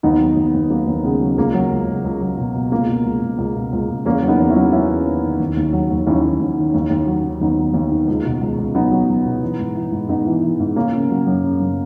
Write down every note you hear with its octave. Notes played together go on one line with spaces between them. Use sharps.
D#2 B3 D#4
F#3
D#2
D#2
F#3 A#3
D#2
C#3 G#3 B3
F#3
C#2 A#3
F#3
C#2
C#2
C#2
F#3
B2
B2
C#2 A#3
B2
C#2
C#2
C#2
B2
C#2
C#2
E2 A#3 C#4
F#3
B3 D#4
E2
C#4 E4
F#3
F#3 C#4 E4
E2
D#3
D#3
D#2
D#2
F#3
D#2
D#2 C#4 E4
D#2
D#2
D#3
D#2
D#2
F#3
D#3
D#2 B3 D#4
F#3
D#2
D#3
C#2
B2
C#2
C#2
F#3 B3 D#4
F#3
F#3
B2
E3
G#2
E3
G#2
G#2 B3 D#4
E3
E3
G#2
C#3 A#3 C#4
C#3
F#3
F#2
C#3
F#2